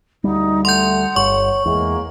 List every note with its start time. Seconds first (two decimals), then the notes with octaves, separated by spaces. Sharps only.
0.24 D2 G3 D#4
0.65 A3 F#5 C6 G6
1.16 G1 C#5 C#6
1.66 E2 G#3 A#3